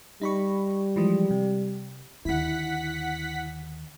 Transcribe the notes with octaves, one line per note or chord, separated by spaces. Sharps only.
G3 D#4 B5 C#6
E3 F3 G#3
C3
D#2 D3 E4 F#5 B6